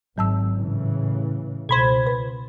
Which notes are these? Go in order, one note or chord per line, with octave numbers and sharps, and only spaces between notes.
G#1 F#3 A5 E6
A2 C#3 E3
C#2 B2 C5 B5 G#6
B4